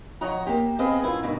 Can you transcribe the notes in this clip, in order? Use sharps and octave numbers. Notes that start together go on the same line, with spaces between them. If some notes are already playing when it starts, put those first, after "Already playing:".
F3 C#5 D#5 F#5 A#5
A#3 G4
B3 C4 G#4 B4 D#5 F5
F#2 E4 F4
D2 G2 B2 D#3